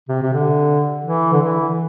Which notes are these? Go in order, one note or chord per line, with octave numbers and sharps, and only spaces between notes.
C3
C3
D3
E3
D3
E3